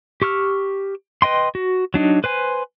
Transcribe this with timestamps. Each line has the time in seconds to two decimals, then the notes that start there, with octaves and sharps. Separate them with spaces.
0.22 G4 C#6 E6 F6
1.22 B4 D#5 G5 C6
1.55 F#4
1.94 F#3 D4 D#4
2.24 B4 C5 G#5